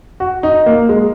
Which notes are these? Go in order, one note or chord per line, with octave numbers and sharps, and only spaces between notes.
F#4
D#4
A#3
G#3